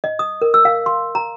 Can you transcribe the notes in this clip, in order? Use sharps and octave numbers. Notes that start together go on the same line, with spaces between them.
D#5
D#6
A#4
E6
F5
C6
A#5